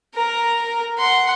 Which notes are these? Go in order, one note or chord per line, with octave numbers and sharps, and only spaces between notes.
A#4 A#5
F#5 C6